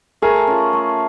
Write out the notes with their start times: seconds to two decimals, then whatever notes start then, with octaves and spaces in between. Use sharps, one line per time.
0.22 A3 G#4 A#4
0.47 C#4 F4
0.73 A3